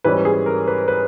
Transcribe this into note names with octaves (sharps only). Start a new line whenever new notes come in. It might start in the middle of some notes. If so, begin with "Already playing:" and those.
G#2 E3 G3 C#4 B4
G#4
A#4
B4
B4